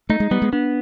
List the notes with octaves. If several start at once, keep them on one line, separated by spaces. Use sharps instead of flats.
A3 D#4
G#3
G3 B3
G#3
B3 D4